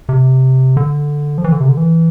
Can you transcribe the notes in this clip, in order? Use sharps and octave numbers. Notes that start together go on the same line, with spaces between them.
C3
D3
F3
E3
D3
C3
D3
E3